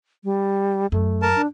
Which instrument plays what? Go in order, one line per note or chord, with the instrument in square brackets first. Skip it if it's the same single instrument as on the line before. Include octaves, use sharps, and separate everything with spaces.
[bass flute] G3
[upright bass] F#2 [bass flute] A3
[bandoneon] A#4 A5
[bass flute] D4